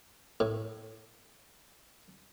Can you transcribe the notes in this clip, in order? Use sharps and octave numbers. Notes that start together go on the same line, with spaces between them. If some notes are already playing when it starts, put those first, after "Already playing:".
A2